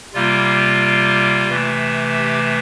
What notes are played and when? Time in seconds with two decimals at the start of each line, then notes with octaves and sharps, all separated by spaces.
0.14 C3 G3 A#3 F4
1.48 C3 E3 A3
2.15 G4